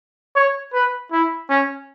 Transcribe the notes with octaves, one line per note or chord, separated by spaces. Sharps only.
C#5
B4
E4
C#4